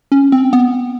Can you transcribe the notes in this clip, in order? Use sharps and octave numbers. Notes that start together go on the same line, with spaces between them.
C#4
C4
B3